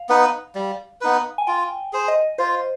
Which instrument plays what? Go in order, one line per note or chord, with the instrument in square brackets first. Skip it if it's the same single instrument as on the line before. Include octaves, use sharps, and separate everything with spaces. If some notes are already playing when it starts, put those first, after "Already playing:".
Already playing: [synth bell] F5
[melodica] B3 D#4 B4
G3
B3 D#4 B4
[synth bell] G#5
[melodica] F4 [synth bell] G5
[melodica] G#4 C5
[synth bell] D#5
[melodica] F4 [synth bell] C5